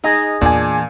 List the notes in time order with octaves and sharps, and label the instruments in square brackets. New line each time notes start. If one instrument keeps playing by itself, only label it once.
[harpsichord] D#4 [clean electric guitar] G#4 D#5
[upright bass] E2 [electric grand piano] A#2 G#5 [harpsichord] D4